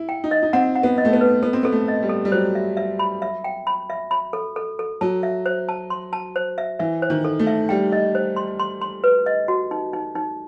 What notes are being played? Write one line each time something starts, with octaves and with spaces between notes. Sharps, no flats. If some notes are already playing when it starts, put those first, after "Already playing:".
Already playing: E4
G5
D#4
D#5
D#4
C4 F#5
F#5
B3
D#5
A3
B3
B4
B3 A4
C4
B3 A4
A3
D#5
G3
A4
G3
F#3 C5
E5
E5
B5
E5
G5
B5
E5
B5
A4
A4
A4
F#3 A5
E5
C5
A5
C6
A5
C5
E5
E3 E5
C5
D#3
A4
A3
E5
G3 G5
D#5
C5
C6
C6
C6
B4
D#5
F#4
D#4
D#4
D#4